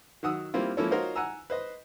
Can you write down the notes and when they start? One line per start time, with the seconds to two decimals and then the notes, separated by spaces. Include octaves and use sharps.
0.23 D#3 F#3 F#5 D#6 E6
0.54 G3 A#3 C4 E4 F4
0.77 F3 A#3 C#4 E4 A4 C#5
0.91 F4 F#4 A#4 C5 C#5 D#5
1.16 F#5 G#5 A#5 E6
1.50 B4 C5 D#5